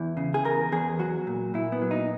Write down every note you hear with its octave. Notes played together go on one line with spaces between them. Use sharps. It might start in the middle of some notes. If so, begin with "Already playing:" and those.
Already playing: E2 E4
C#3
G#4
E2 A#4
E2 G#4
F#3 F#4
A#2
A#2 E4
B3
F#3
D#4